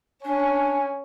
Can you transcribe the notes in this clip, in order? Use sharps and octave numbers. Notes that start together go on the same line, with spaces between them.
C#4 D4 G#5